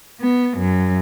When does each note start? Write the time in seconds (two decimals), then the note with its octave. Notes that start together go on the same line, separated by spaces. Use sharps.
0.21 B3
0.58 F#2